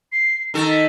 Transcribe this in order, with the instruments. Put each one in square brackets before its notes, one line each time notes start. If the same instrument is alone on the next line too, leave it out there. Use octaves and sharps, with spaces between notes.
[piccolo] C7
[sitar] D#3 A4 [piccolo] A#5
[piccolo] B6